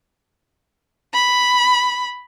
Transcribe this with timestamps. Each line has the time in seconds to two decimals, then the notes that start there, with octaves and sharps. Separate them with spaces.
1.14 B5